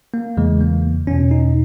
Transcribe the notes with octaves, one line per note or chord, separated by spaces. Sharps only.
A#3
E2 C#3 E3 G#3
A#3
E2 B2 C#4
D#4